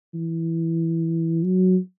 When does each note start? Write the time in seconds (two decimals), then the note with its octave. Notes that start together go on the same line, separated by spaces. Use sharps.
0.14 E3
1.43 F#3